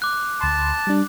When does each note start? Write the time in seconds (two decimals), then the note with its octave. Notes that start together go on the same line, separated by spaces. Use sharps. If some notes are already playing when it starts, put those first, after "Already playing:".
0.02 D6 F#6
0.41 D2 A5 B5 C6
0.87 G3 D4